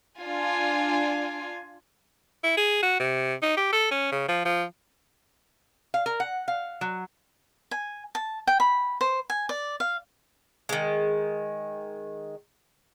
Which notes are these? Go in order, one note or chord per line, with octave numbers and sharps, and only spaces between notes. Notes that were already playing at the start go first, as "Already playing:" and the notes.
D4 F4 G#5
E4
G#4
F#4
C3
D#4
G4
A4
C#4
C#3
F3
F3
F5
A#4
F#5
F5
F#3
G#5
A5
G5
B5
C5
G#5
D5
F5
D#3 G#3